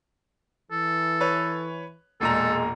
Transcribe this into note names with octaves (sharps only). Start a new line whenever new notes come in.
E3 A4
B4 C#5
E1 A#2 G#3 A4 A#5